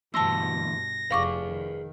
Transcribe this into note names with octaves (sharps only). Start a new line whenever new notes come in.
D2 G2 B2 E3 A5 C6 E6 A#6
F1 G#4 B4 F5 C#6 D6
D#3